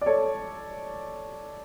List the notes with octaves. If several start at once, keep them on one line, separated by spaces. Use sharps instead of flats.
D5
A4 C#5